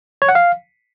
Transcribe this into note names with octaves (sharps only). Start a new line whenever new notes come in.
C#5
F#5
F5